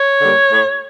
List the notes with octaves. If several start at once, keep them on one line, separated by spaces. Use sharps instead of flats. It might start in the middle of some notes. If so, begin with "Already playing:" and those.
Already playing: C#5
D3 G3 A#3
A2